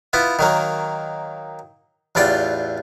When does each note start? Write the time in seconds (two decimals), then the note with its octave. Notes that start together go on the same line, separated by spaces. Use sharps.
0.13 B3 E4 F4
0.39 D#3 F#3 A#3
2.15 A1 E2 F4 D5 G5 C6